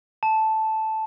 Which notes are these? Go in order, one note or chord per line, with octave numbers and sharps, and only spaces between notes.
A5